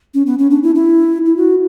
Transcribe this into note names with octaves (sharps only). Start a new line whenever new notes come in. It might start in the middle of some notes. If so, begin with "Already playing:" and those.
C#4
B3
C#4
D4
E4
E4
E4
F#4